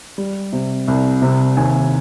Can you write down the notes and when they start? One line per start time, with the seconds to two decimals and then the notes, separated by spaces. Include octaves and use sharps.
0.18 G3
0.53 C3
0.88 C2
1.22 C3
1.57 D#2 G#5